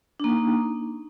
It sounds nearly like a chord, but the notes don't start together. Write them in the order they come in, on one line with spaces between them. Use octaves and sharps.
D4 A#3 D#4